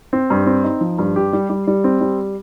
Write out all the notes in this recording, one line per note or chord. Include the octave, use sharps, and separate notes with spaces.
C4
G2
C4
D#4
F3
G2
G4
G3
G3
G3
C4
G3